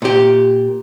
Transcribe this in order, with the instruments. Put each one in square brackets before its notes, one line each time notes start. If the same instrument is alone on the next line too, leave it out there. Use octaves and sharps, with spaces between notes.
[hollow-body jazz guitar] A#2 G4